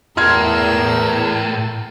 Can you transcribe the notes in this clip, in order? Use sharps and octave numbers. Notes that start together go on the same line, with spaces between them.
E2 A2 A#4 C6 E6 F6 G#6